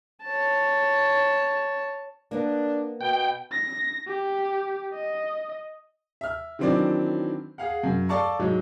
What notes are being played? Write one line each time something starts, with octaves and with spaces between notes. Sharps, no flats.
C#5 A5
A#3 B3 D4 A#4
B2 G5
A#6
G4
D#5
E5 F6
D#3 E3 F#3 C4 D4 D5
G#4 F5 F#5
F#2
A4 D5 F5 A5 C#6
G#2 F#3 G#3